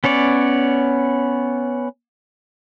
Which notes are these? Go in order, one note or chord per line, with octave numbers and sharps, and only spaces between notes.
B3 C#4 C#5 D5